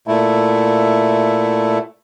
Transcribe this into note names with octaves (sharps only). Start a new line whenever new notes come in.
A#2 A3 E4